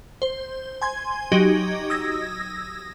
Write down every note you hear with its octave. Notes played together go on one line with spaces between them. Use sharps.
C5
G#5 C6 G#6
F#3 D#4 F#4 G4 D#5 G#6
D#6 E6 G#6 A#6